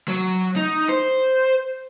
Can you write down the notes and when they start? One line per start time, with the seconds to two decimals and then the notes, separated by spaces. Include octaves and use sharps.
0.08 F#3
0.56 D#4
0.89 C5